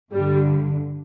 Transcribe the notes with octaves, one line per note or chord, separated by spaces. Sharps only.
G2 D3 G3